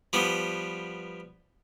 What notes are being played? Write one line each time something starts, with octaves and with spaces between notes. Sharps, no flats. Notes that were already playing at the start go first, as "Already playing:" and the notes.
F3 G3 B3